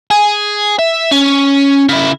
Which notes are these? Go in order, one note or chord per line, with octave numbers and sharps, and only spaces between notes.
G#4
E5
C#4
C#3 E4